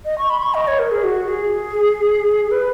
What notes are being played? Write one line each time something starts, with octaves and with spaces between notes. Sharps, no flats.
D#5
C#6
B5
C#6
D#5
C#5
A#4
G#4
F#4
G#4
B4